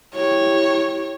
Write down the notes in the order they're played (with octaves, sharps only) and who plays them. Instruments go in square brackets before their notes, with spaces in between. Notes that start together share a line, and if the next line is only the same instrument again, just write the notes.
[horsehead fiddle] E4 G4 [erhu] C#5